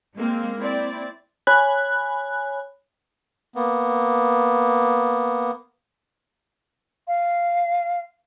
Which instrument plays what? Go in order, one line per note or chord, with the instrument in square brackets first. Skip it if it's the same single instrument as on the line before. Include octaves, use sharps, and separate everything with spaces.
[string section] G#3 A#3 C4
C4 E4 D5
[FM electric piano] C#5 G#5 B5 F#6
[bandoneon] A#3 B3
[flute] F5